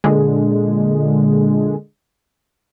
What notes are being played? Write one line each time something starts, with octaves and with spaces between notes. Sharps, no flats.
A#2 D3 G#3